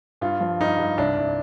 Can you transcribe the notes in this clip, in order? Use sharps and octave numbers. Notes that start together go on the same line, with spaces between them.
G2 F4
F3
G2 D#4
G2
C2 D4
C2